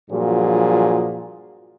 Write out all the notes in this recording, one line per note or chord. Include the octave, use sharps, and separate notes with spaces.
G2 A#2 F3 F#3 F#4 G#4